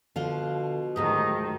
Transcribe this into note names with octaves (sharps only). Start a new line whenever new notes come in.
B2 D3 F3 F5 C6
D2 G#2 D#3 F3 F#3 G4 D#5